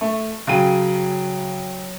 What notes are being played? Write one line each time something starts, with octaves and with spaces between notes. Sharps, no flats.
A3
C#3 F#3 G5 D#7